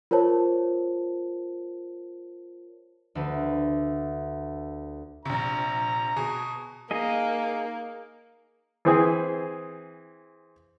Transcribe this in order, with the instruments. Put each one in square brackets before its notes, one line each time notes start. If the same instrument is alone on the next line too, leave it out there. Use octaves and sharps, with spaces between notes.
[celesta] F4 A#4 C5 C#5 A5
[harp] D2 B4
[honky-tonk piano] A#1 C3 [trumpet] A#5
[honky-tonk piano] B2 G#4
[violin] A#3 [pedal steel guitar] D#4 G#4 D#5
[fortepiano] E3 C4 G#4